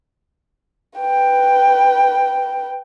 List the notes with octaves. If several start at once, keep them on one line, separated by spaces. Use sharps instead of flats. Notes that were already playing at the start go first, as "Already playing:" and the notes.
B4 G5